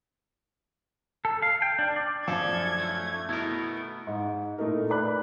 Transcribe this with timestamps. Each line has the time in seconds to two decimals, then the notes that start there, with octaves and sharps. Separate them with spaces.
1.25 A4
1.42 F5
1.62 G5
1.79 D4
1.96 D5
2.28 F#2 F3 D4 A4 F5 D6 G#6
2.78 A3
3.29 B2 A3 B3 E4 A#4
4.07 G#2
4.58 A#2 A3 D#4 E4 A#4
4.88 A#4 B4 D5 B5 F#6